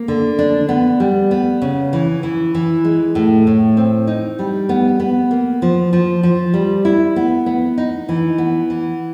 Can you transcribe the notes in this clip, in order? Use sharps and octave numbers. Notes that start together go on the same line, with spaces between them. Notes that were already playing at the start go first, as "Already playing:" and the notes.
Already playing: A#3
D3
D4
B3
G3
B3
C#3
E3
E3
E3
G#3
A2
A2
C4
D#4
G3
B3
B3
A#3
F3
F3
F3
G3
E4
B3
B3
D#4
E3
B3
E3